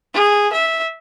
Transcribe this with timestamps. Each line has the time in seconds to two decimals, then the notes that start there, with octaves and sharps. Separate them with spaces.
0.14 G#4
0.53 E5